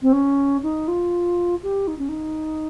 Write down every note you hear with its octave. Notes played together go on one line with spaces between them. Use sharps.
C4
C#4
D#4
F4
G4
D#4
C#4
D#4